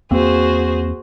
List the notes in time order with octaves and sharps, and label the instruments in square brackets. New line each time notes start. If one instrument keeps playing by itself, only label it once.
[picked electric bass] E2 A#3 C4 [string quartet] F#4 G#4 C5